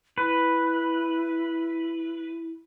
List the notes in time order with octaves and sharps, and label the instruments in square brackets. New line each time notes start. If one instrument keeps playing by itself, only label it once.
[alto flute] E4 [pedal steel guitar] B4